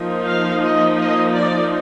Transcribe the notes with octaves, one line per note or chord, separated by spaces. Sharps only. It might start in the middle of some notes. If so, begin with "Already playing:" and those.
Already playing: F3 A#3 D#4
F5
D#5
D#5
D5